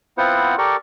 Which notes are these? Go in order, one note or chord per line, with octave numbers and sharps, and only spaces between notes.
B3 C4 E4 F4 C5 F#5
G4 A4 A#4 D5 C#6